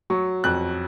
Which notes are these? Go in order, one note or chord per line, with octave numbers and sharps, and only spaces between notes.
F#3 C#6
F2 F#6